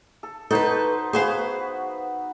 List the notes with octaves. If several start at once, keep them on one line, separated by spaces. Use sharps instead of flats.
A4
D#4 F#4 A4 B4 C5
B3 F#4 G#4 B4 C5 F5